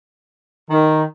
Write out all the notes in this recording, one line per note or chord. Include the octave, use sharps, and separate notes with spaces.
D#3